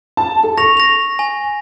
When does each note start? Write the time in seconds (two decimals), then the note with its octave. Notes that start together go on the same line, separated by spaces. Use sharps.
0.17 A5
0.43 A4
0.58 C#6 A#6 F7
0.77 A#6 F7
1.19 G#5